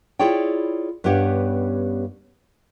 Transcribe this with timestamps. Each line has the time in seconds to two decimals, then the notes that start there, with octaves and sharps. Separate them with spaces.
0.19 E4 F4 G#4 C#5 D5 G5
1.04 G2 B3 C#4 G4 C#5 F#5